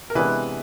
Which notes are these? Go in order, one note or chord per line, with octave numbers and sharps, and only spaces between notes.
A#4
C3 E3 G#3 B3 D4 B4